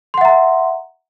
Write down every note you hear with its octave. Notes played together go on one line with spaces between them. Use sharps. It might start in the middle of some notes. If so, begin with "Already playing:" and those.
E5 F#5 A#5 C6